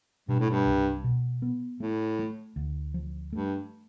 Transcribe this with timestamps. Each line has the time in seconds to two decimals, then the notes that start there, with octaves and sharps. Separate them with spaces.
0.28 G2 B2
0.40 A2
0.50 G2
0.66 C2
1.04 B2
1.42 B3
1.80 A2 A3
2.19 A3
2.56 D2
2.94 F3
3.32 G2 A3